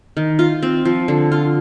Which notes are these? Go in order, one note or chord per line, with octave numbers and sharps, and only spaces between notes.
D#3
F4
C4
F3
D3
F4